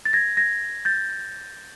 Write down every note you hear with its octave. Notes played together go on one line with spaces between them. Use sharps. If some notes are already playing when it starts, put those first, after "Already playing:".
A6
G#6 A#6
G#6 A#6
G6 A6